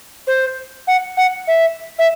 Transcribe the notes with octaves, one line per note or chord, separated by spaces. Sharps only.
C5
F#5
F#5
E5
E5